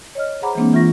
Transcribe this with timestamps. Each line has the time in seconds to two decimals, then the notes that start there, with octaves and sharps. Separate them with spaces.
0.15 C#5 D#5 F6
0.42 G#4 C5 F#5 A#5 B5 D6
0.55 E3 G#3 A#3 C4 D4
0.73 E3 F4 E5 C#6 A#6